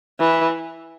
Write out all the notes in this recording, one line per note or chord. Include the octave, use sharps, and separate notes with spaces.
E3